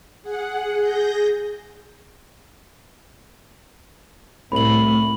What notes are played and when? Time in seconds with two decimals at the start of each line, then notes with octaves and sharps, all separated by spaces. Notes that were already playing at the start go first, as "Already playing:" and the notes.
0.22 G#4 F#5
0.79 G#4 G6 A#6
4.52 C2 A2 B5 F#7